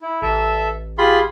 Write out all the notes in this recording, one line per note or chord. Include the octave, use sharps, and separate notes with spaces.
E4
A1 A4 E5
F4 G4 G#4 B5 C6